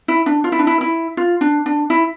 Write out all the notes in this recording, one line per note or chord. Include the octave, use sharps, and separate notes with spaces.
E4
D4
F4
E4
D4
E4
E4
F4
D4
D4
E4